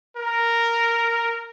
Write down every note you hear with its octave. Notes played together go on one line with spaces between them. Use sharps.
A#4